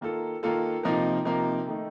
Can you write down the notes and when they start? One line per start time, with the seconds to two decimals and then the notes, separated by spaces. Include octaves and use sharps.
0.01 D#3 A#3 F4 A4
0.43 D#3 A#3 F4 A4
0.83 C3 F3 A#3 D#4 A#4
1.25 C3 F3 A#3 D#4 A#4
1.66 D#3 A3 D#4